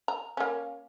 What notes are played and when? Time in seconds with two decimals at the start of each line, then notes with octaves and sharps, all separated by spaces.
0.08 A#5
0.37 A#3 C#4